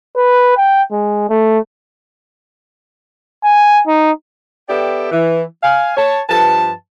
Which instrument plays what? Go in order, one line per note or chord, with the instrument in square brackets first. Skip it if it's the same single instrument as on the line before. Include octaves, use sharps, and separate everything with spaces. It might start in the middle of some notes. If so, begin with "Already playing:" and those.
[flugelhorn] B4
G5
G#3
A3
G#5
D#4
[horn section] B3 G4 A4 D5 E5 G5
E3
F5 G#5
C#5 A5
G2 F3 B4 A5